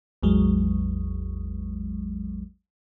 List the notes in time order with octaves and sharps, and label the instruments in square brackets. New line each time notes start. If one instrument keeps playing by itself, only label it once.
[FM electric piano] A1 E2 F#3 G#3